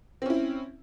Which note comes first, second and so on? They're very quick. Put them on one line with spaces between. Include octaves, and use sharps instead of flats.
C4 C#4 E4